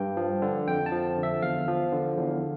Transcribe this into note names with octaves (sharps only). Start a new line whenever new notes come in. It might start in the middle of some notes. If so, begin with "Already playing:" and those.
Already playing: G2 G5
F3
D3
F2 G5
A5
F3
D3
E5
E2 F5
F3
D3
E2